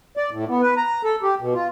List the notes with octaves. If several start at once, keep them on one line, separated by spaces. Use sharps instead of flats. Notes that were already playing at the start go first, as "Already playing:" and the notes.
D5
A2
B3
B4
A#5
A4
G4
B2
F4